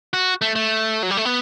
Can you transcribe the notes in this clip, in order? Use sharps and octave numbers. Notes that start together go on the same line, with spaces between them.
F#4
A3
A3
F#3
G3
A3
B3